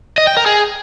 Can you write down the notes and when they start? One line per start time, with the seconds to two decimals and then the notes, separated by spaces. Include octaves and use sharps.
0.18 D#5
0.27 G5
0.37 A#4
0.46 G#4